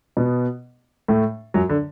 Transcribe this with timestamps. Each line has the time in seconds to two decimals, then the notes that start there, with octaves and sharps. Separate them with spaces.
0.17 B2 B3
1.08 A2 A3
1.54 F#2 F#3
1.69 D3